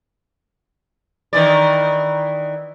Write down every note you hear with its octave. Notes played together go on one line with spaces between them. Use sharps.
D#3 E3 D5